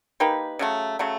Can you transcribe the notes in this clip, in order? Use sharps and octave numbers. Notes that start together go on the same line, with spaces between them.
A#3 D#4 G4 B4
C#3 F#3 A3
C#3 F#3 A3